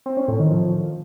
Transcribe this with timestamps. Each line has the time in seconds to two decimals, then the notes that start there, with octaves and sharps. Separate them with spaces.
0.06 C4
0.17 C#4
0.28 A2
0.39 D#3
0.51 F3